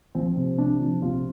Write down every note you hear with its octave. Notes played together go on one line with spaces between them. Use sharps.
F3 C4
C3
C3 D4
F3
C3 F4